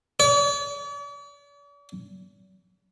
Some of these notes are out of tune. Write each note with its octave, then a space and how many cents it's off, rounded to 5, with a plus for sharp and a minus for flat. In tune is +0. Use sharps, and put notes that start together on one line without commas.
D5 -45